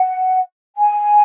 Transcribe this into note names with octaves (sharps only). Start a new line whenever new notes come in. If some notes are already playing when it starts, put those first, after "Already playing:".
Already playing: F#5
G#5